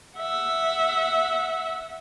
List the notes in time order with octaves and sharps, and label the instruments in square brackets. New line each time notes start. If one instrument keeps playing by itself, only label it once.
[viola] E5 F#5